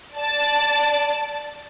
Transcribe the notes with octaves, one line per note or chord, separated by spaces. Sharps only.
D5 A5